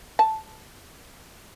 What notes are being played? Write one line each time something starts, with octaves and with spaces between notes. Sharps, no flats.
A5